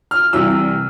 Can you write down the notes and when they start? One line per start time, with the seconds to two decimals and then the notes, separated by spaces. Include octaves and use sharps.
0.11 F6
0.33 C2 C3 E3 G3 E6